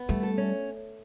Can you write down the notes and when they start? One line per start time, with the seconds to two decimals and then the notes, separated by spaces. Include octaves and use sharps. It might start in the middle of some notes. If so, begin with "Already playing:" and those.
Already playing: B3
0.09 G3 A3
0.23 A4
0.38 C#4